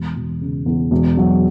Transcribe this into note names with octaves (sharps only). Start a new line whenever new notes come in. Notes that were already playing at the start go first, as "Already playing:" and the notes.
Already playing: E1
E1
C#3
E2
E1
F#3